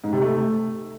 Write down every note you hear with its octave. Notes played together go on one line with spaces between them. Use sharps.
G#2
C3
A3